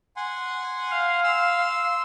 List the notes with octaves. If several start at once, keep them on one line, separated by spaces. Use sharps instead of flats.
F#5 G#5 C6
F5
C6 E6